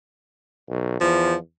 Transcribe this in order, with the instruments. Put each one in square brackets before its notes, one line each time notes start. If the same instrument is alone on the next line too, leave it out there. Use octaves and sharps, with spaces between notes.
[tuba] B1
[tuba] E2 [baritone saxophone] F3